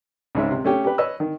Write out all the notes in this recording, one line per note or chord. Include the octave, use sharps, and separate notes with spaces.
C#2 G#2 E5
C3
A3 C#4 G4
G4 B4
B4 C#5 D#5 E6
D#3